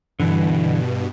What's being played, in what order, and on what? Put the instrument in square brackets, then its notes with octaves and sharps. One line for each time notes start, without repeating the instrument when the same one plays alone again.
[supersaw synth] G2 B2 [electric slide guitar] D3 E3